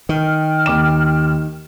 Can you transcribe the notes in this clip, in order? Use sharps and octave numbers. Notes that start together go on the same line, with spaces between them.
D#3 G5 F6
D#2 D6 E7